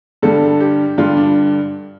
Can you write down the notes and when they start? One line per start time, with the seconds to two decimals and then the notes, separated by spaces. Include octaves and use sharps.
0.22 G2 D3 G3 A4
0.60 G4
0.98 G2 D3 G3 F4
1.17 D4